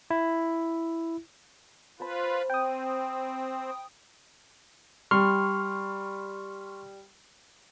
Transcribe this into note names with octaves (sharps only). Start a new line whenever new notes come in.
E4
F4 B4 C5 A5 B5
C4 G5 D#6
G3 C6 C#6 F6